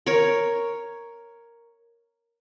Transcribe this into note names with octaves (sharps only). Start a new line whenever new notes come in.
A#4 C#5